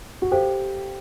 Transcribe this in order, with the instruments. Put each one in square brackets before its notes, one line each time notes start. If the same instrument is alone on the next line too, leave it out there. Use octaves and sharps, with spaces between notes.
[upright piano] F#4
[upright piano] G4 [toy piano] A4 C5 F5